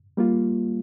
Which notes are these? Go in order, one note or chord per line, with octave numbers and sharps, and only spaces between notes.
G3 A#3 F4